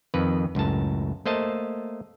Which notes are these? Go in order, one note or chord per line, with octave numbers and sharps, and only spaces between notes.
F2 D#3 B4
C#2 F#2 A2 A5
A3 A#3 C5 D#5 A5